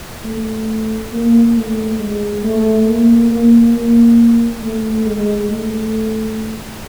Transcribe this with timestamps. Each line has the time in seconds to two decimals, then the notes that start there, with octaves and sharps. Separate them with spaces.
0.24 A3
1.12 A#3
1.56 A3
1.99 G#3
2.43 A3
2.86 A#3
3.31 A#3
3.74 A#3
4.62 A3
5.06 G#3
5.50 A3